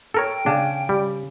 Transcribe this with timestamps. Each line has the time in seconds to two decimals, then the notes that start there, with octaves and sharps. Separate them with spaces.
0.14 A4 A#4 C#5 G5
0.46 C#3 D4
0.89 G3